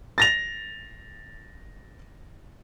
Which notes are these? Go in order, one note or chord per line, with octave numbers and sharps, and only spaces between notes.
A6 A#6 F7